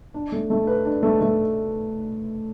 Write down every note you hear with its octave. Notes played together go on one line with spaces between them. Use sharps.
D4
A3
A3
B4
D4
A3
A3